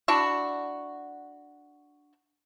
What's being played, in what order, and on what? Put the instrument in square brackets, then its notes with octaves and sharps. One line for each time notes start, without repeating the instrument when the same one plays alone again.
[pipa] D4 E4 F#4